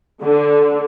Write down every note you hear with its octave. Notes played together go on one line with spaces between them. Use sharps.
D3